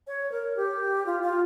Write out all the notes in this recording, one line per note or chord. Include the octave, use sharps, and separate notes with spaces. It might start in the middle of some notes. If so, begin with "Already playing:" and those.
C#5
A#4
G4
F4
F4